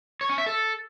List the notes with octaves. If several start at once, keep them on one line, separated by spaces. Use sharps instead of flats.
C#5
C#4
E5
A4